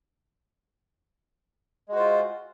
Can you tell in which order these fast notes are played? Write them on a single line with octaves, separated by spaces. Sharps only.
G#3 F#4 C5 F4